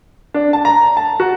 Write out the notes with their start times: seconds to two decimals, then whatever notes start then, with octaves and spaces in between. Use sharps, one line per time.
0.34 D4
0.53 A5
0.65 A#5
0.97 A5
1.20 F#4